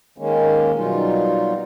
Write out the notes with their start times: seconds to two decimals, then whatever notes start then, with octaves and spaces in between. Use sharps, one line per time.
0.18 D#3 G#3 A#3 C#4
0.76 B2 F#3 G3 D#4 F4